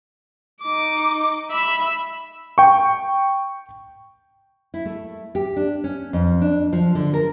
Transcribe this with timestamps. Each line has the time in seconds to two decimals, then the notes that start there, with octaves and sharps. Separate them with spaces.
0.62 D#4 D6
1.51 E5 B5
2.58 G5 C#6
4.74 E4
4.85 A3
5.35 G4
5.56 D4
5.84 C#4
6.13 F2
6.41 D4
6.72 F3
6.95 D3
7.13 A#4